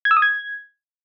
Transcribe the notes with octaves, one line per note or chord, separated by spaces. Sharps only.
G#6
E6
D#6
G#6